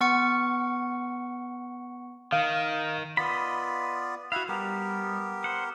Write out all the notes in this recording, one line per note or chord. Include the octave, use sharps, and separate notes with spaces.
B3 F#5 C#6 C#7
D#3 F5
B3 F4 D5 D#5 B5
E4 F#4 F5 F#5 B5
G3 B3 G4 A#4
C5 F#5